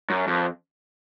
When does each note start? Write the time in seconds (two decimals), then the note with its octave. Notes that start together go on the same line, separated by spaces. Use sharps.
0.10 F#2
0.27 F2